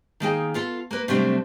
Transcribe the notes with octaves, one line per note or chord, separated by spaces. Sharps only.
D#3 A#3 G#4 G5
B3 F4 A4
A#3 B4
C3 F#3 G3 A3 C4 D4